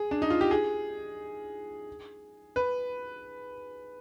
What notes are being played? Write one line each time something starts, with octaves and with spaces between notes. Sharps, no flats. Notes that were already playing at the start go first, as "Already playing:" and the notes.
Already playing: G#4
D4
D#4
F4
G4
G#4
B4